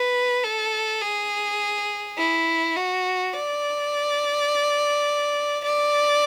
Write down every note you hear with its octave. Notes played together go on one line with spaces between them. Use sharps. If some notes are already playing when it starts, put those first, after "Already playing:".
Already playing: B4
A4
G#4
E4
F#4
D5
D5